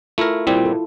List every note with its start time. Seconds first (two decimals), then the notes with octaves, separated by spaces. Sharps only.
0.18 A3 E4 F4 A#4
0.47 A#2 G3 C4 E4
0.56 F4
0.65 A4